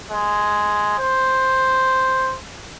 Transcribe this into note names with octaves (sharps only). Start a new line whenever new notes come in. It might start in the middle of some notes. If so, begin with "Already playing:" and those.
G#3
C5